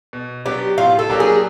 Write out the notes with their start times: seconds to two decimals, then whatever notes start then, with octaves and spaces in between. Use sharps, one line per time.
0.13 B2
0.45 F#3 B3 D4 G4
0.78 A2 F4
0.99 A4
1.10 F#3 A#3 D4 G4
1.20 G#4